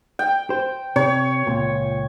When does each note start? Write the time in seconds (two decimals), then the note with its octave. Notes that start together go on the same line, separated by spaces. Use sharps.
0.19 G5
0.50 C5
0.96 C3 C#5
1.47 C#2 A#2